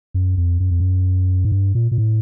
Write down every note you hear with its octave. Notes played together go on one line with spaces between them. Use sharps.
F#2
F2
F#2
F2
F#2
G#2
G2
A#2
A#2
A2